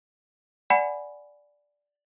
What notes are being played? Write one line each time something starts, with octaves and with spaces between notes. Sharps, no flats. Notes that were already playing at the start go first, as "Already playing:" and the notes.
D5 F#5 G#5 B5